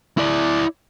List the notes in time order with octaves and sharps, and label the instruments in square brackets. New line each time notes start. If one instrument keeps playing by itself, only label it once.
[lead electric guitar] E4 D5